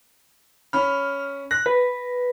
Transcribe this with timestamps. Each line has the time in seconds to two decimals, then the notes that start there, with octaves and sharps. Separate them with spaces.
0.73 C#4 B5 F6
1.51 F#6 A#6
1.66 B4